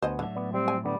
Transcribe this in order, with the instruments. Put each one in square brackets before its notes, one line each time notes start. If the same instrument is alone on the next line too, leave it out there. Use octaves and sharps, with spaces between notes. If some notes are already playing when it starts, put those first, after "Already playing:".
[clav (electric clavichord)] D2 B3 G#5 [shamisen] C5 D#5
[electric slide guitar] A2 F#3 E5 [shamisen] D3
[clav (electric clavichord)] B3 D5
[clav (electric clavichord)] G3 [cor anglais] C4
[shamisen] G#5
[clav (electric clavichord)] D3 B3 [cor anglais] G3